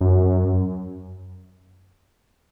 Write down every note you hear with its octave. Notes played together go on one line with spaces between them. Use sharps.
F#2